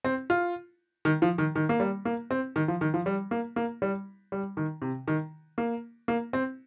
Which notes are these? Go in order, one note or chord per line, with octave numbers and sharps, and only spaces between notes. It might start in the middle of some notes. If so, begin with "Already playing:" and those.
C4
F4
D#3
F3
D#3
D#3
A#3
G3
A#3
C4
D#3
F3
D#3
F3
G3
A#3
A#3
G3
G3
D#3
C3
D#3
A#3
A#3
C4